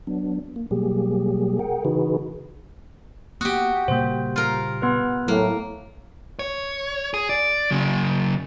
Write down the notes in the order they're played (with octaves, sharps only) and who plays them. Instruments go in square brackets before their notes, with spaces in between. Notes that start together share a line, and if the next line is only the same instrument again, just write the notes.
[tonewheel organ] F#3 B3 D4
A#3
B2 F#3 G3 A#3 G4 G#4
G#4 A#4 F#5 G5
C#3 E3 D#4 F#4 G#4 B4
[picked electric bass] A#3 B3 [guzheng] F#4 G4 [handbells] D#6
[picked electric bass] A#2 C#3 G3 [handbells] A#3 C5
[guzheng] F4 A#4
[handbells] B3 B4 F6
[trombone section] A2 [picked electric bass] F#3 [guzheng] A#3
[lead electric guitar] C#5
G#4
D5
C#3 F#3